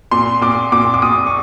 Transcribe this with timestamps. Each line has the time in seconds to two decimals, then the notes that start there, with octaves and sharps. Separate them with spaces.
0.11 A#2 C6
0.41 A#2 D6
0.72 A#2 D6
0.94 D6
1.02 A#2 D#6
1.27 C#6